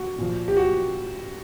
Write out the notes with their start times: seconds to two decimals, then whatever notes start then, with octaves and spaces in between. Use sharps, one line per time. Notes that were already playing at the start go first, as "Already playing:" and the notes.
Already playing: F#4
0.18 A#2 F3
0.48 G4
0.57 F#4